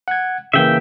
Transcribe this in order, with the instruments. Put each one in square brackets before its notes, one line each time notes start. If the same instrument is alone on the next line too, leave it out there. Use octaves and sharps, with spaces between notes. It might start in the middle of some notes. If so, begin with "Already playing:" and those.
[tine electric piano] F#5 G#6
[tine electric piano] C#3 E3 A#3 [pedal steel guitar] E5 G5